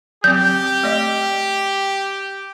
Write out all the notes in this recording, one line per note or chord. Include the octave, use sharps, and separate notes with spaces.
F#3 C4 G4 G6
A3 D5 D#5